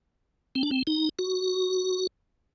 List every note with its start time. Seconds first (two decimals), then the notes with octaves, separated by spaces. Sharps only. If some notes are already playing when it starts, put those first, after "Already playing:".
0.55 C4
0.63 D4
0.71 C4
0.87 D#4
1.19 F#4